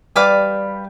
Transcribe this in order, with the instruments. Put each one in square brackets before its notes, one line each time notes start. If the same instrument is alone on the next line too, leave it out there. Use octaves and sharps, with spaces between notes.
[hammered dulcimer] G3 [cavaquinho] B4 F5 A5 D6